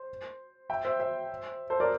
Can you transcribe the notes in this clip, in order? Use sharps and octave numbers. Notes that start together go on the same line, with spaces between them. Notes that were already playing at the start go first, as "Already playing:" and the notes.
Already playing: C5
E5 G5
C5 E5
C5 E5
A4 C5
A#4 D5